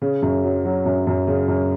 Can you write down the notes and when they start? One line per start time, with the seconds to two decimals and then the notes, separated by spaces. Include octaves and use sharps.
0.02 C#3
0.22 F#2
0.44 F#3
0.65 F#3
0.85 F#2
1.07 F#2
1.27 C#3
1.48 F#2